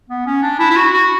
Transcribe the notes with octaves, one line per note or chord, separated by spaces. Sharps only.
B3
C#4
D4
E4
E4
F#4
F#4